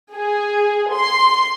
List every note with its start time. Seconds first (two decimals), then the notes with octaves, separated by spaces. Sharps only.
0.15 G#4
0.93 C6